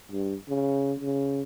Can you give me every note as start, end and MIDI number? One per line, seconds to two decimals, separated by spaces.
0.11 0.35 43
0.48 0.94 49
0.99 1.42 49